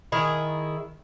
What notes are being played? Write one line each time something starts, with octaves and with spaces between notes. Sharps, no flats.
D#3 E4 G#4